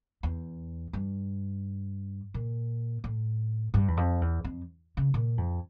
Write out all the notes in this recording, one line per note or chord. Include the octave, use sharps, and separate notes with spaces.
E2
G2
A#2
A2
G2
E2
F2
E2
F2
C#3
A#2
F2